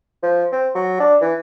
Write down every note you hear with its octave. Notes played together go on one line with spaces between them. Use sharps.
F3
C4
F#3
D4
E3